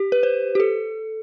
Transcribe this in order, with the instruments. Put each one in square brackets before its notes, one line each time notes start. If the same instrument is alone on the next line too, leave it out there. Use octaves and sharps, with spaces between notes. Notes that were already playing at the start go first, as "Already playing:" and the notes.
Already playing: [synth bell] G4
B4
C5
G4
A4